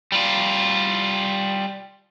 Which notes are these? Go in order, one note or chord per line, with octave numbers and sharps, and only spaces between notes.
G3 F4